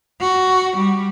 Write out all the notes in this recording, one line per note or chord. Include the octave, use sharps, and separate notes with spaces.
F#4
G3